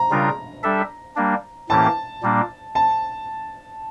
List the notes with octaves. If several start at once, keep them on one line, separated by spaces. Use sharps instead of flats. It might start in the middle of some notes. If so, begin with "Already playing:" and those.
Already playing: A#5
C#3 G3 D4 F4 A#4
G3 D4 A4 E5
G3 A#3 D4
A2 E3 A#3 C#4 G4 A5
A#2 G3 A#3 D4
A5